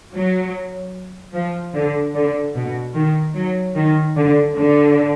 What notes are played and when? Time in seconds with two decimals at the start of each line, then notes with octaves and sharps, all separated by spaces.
0.14 F#3
1.34 F3
1.75 D3
2.15 D3
2.55 B2
2.95 D#3
3.35 F#3
3.76 D#3
4.16 D3
4.55 D3